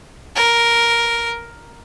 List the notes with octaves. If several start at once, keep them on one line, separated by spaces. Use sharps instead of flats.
A#4